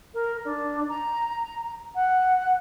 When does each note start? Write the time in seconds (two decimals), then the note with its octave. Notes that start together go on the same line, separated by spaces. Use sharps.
0.14 A#4
0.44 D4
0.88 A#5
1.94 F#5